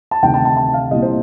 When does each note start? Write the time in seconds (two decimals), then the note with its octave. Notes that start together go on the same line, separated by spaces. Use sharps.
0.11 A5
0.22 D2 C3 D#3 G5
0.34 A5
0.45 A5
0.57 A5
0.74 F5
0.91 C2 A#2 D#5
1.02 C5